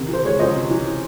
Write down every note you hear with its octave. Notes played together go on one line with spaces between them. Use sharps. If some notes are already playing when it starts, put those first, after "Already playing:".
Already playing: C3 D#3
E3 C5
G#3 C#5
C#2 C5 D#5
C3
E3